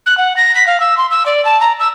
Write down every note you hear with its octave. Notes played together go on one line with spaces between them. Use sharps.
F#6
F#5
A#6
B6
F5
E6
C6
E6
D5
A5
A#5
E6